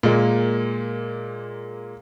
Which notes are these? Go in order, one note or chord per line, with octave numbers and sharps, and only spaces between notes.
A#2 G#3 A#3